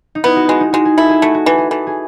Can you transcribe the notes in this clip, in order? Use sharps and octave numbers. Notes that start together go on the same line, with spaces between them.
D#4
B3 E4
F#4
G#3 F#4
D#4
G#3 F#4
G#4
E4 A4
G#4
A3 F#4
F#4
E3 A4
G#4
E3 A4
G#4